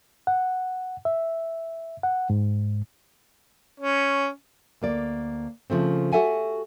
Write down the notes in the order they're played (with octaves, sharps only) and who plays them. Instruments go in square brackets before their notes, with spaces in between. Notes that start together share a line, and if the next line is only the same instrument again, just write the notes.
[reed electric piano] F#5
E5
F#5
G#2
[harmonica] C#4
[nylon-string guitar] D2 A#3 D5
C#3 F3 A3 C4
F#4 G4 A4 E5 F#5 G#5